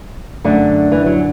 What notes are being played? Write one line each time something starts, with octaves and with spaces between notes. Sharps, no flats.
F#2 D3 A3
E3
F#3